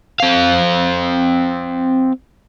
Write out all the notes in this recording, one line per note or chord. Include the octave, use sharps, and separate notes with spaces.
C4 F5